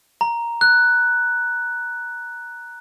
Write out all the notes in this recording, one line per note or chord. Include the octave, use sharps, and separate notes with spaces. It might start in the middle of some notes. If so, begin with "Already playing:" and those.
A#5
F#6